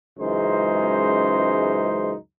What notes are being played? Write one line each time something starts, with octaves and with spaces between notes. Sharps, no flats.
C#2 F#2 E3 G#3 D#4 C5